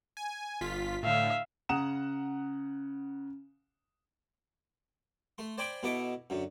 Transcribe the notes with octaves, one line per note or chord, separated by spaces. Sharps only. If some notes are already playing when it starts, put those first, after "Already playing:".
G#5
G1 F4 B6
A2 D3 E5 F5
C#3 F#5 A#5 D#6 E7
A3 C6
C5 D5 G5 G#5 B5 D6
B2 B3 E4 A4 D#5 D6
F#2 D3